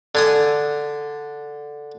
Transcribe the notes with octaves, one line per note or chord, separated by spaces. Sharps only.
D3 G#5 D#6